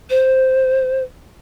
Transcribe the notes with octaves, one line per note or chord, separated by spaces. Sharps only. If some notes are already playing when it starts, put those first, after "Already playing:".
C5